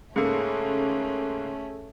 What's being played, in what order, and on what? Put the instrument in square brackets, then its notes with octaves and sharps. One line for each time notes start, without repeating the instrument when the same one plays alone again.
[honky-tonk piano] G#2 C#3 A#3 [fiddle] A3 C#4 [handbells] G#4 A4